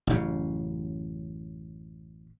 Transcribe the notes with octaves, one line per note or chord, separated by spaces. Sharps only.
A1 F#2 C#3